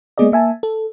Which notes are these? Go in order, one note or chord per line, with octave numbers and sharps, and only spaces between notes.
G#3 A#3 B3 G#4 D5 D#5
A#3 E5 G#5 A5
A4